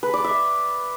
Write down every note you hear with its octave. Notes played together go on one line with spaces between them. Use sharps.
B4
D5
E5